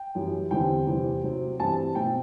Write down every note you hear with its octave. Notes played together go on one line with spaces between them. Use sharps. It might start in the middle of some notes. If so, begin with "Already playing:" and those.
Already playing: G5
F#2 E3 G3
E2 D3 G3 C4 G5
E2 C3 G3 C4
C3 F#3 C4
G2 E3 G3 C4 A5
B2 F#3 A3 C4 G5